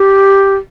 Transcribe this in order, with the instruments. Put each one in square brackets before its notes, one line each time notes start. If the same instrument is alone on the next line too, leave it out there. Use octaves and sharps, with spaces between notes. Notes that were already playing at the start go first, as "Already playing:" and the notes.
Already playing: [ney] G4